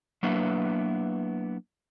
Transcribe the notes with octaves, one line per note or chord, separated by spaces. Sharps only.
F#3 A#3 B3 D4 E4 B4